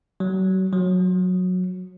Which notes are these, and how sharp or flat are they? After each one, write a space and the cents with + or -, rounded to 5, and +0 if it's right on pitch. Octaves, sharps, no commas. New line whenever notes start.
F#3 +30
F#3 -20